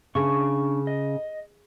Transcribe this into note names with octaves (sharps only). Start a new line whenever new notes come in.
C#3 D4 C#6
D#5